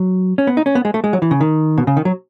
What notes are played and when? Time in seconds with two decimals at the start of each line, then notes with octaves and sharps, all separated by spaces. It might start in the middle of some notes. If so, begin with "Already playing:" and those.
Already playing: F#3
0.38 C#4
0.47 B3
0.57 D#4
0.66 C#4
0.75 B3
0.85 G#3
0.94 A3
1.04 G#3
1.13 F#3
1.22 E3
1.31 C#3
1.40 D#3
1.78 B2
1.87 C#3
1.97 D#3
2.05 F#3